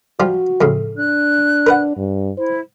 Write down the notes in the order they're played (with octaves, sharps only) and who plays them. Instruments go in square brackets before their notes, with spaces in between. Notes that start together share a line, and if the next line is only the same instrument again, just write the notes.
[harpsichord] F3 G3 F4 [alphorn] F#4
[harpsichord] F2 A2 C#3
[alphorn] D4 [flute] F#6
[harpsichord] A#4 B4 F#5
[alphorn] G2
[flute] E4 [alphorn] C5